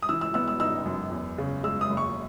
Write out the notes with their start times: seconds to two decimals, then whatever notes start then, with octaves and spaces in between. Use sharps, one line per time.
0.02 D#6
0.09 E3 E6
0.21 E6
0.34 B3 E6
0.48 E6
0.60 D#4 E6
0.86 F#2
1.11 E2
1.38 C#3
1.63 G#3 E6
1.81 D#6
1.90 F#1
1.97 C#6